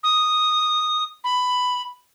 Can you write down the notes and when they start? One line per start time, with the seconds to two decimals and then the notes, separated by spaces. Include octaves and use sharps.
0.03 D#6
1.24 B5